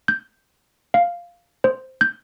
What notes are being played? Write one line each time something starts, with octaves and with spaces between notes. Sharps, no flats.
G6
F5
C5
G6